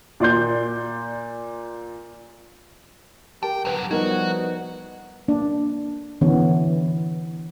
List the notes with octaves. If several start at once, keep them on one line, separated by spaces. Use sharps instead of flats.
A#2 D5 C6 G6
G4 A#4 G5 A5
D3 F#3 B4 G5
F3 G3 B3 D#4 F#4 A#4 G#6
A#3 D4
D3 E3 B3 C#4 C#5